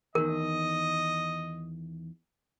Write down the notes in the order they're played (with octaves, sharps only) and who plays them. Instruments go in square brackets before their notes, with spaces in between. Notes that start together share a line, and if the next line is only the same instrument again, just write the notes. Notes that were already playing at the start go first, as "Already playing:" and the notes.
[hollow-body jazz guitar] E2 D#3 [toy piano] A#4 [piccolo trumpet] D#5